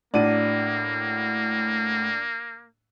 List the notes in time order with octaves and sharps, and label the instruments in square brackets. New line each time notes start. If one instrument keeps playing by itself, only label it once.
[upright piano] A2 F#4 D#7 [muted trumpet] A#3 [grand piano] D4